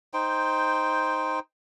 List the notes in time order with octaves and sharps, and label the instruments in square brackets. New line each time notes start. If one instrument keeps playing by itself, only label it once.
[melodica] D#4 C5 G5